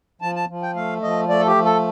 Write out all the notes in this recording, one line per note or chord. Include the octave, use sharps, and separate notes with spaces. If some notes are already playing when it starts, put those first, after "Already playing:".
F3 A5
A5
F3
G5
A3 F5
F3 D#5
A3 D5
A4
G4
F3
A4